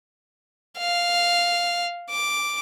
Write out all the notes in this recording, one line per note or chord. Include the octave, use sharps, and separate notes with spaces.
F5
D6